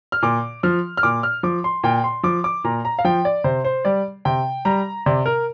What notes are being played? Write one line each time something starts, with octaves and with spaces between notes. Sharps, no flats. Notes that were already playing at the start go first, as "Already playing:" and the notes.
F6
A#2 D6
F3 F6
F6
A#2 D6
F6
F3 D6
C6
A#2 G5
C6
F3 D6
D6
A#2 A#5
A#5
F5
F3 G5
D5
C3 C5
C5
G3 D5
C3 G5
G3 A#5
C3 D5
A#4